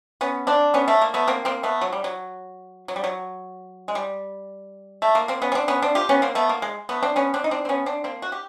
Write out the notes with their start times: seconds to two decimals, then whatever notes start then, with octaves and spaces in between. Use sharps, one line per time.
0.21 B3 C#4
0.47 C4 D4
0.74 B3 C#4
0.88 A3
1.01 A#3
1.14 A3 B3
1.28 A#3 C4
1.45 A#3 C4
1.63 A3 B3
1.81 F#3
1.93 G3
2.04 F#3
2.88 F#3
2.96 G3
3.04 F#3
3.88 G#3
3.95 G3
5.02 A3
5.15 A#3
5.28 A#3 C4
5.42 B3 C#4
5.52 C#4
5.55 C4 D4
5.68 B3 C#4
5.82 C4 D4
5.95 F4 G4
6.09 B3 C#4
6.22 A#3 C4
6.35 A3 B3
6.49 A#3
6.62 G#3
6.89 A3 B3
7.03 C4 D4
7.16 B3 C#4
7.34 C4 D4
7.44 D#4
7.51 C4 D4
7.65 C4
7.69 B3 C#4
7.86 C4 D4
8.04 A#3 C4
8.22 F#4
8.32 G4